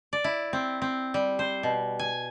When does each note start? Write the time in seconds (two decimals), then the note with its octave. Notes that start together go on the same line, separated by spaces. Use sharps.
0.13 D5
0.24 E4
0.53 C4
0.82 C4
1.14 G3
1.39 C5
1.63 B2
1.99 G#5